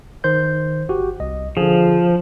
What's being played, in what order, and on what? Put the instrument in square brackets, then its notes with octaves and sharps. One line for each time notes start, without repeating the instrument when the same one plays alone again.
[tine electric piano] D#3 C5 G6
G1 F#4 G4
C2 D#5
[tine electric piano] D3 G#4 [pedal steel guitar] F3